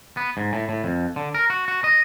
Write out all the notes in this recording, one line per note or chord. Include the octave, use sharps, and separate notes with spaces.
B3
G#2
A2
A2
F2
D3
A#4
F#4
F#4
D#5